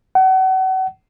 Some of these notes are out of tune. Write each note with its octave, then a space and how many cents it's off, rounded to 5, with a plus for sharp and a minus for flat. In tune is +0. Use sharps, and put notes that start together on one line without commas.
F#5 +35